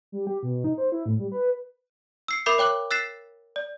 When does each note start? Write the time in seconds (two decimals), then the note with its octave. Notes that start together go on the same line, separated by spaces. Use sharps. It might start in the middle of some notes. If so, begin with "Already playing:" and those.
0.12 G3
0.27 G4
0.43 B2
0.64 D#4
0.78 C5
0.92 E4
1.06 A2
1.19 G3
1.32 B4
2.28 E6 C7 C#7
2.46 A#4 E5 B5 D6 G6 C7
2.58 C#5 G5 D6 F#6 F#7
2.91 E6 F#6 A6 B6 C7 E7
3.56 D5